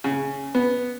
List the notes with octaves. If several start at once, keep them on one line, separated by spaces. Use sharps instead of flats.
C#3
B3